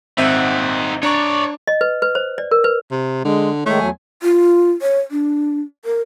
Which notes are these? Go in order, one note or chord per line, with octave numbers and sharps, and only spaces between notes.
G#1 C4 D#4 E5 F#5
D4 C#5 D5 A#5 C#6
D#5
B4
B4
C5
D5
A#4
B4
C3
D3 G#3
D#3 G#3 A3 C#5
E2 F#3 G#5
F4
C#5
D4
A#4